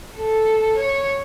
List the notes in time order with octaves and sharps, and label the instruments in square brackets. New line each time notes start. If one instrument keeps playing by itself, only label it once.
[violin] A4
C#5